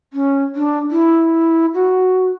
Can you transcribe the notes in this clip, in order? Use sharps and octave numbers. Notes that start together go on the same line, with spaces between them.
C#4
D4
E4
F#4